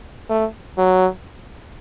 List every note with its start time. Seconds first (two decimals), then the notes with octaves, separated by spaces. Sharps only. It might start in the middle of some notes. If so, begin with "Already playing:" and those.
0.30 A3
0.78 F#3